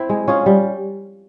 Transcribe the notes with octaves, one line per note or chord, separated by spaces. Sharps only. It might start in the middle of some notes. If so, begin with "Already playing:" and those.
Already playing: C4 E4
G#3
C#4 F4 G#4
G3